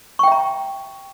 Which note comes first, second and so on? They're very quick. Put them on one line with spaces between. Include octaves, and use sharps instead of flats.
C#6 G5 E5 A#5